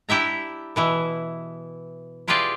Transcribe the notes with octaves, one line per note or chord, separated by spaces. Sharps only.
D4 E4 G4 E5 A#5
B2 E3 E4
E4 F4 G4 G#4 B4 D5